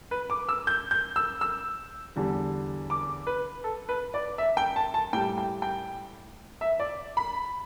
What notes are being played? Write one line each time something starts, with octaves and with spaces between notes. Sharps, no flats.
B4
D6
E6
G6
G6
E6
E6
E2 D3 G3
D6
B4
A4
B4
D5
E5
G5
A5
A5
A2 G3 G5
G5
G5
E5
D5
B5